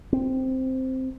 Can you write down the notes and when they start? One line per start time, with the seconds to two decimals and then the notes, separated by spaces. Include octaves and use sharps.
0.13 C4